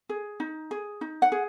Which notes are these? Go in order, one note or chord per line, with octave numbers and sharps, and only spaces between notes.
G#4
D#4
G#4
D#4
F#5
G#4